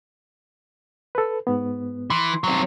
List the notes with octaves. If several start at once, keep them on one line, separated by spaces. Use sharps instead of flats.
A4 B4
G#2 B3
E3 C6
F#3 C4